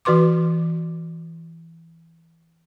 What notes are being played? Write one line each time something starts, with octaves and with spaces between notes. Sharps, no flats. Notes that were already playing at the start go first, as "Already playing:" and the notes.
E3 F#4 B4 C6 D6